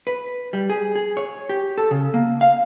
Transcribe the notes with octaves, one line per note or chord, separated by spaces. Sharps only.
B4
G3
G#4
G#4
C#5
G4
A4
C#3
A#3
F5